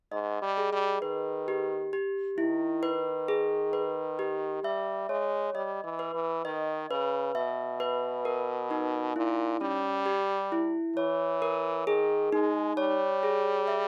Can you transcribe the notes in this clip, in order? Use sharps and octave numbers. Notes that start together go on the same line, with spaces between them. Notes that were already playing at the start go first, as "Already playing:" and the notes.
G#2 D#5
G3
G#4
G3
D#3 B4
G4
G4
D#3 E4
B4
G#4
B4
G4
G3 E5
G#3 C#5
G3 D#5
E3
B4
E3
D#3 D#5
C#3 B4
B2 E5
B4
A#4
D#4
A#2 E4
G3 C#4
G4
E4
E3 C#5
A#4
D#3 G#4
G#3 D#4
G3 C#5
G#4
E5